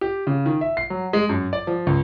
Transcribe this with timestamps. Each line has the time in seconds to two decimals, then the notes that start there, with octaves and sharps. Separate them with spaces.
0.01 G4
0.27 C#3
0.46 D#3
0.61 E5
0.77 C7
0.90 F#3
1.13 G#3
1.29 F#2
1.53 D5
1.67 F3
1.87 C#2